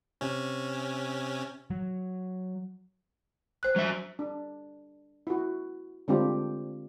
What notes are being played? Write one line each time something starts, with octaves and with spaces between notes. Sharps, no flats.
C3 C#4
F#3
C5 F#6
F#3 E5
D4
E4 F#4
D3 G#3 C4 D4 F4 G4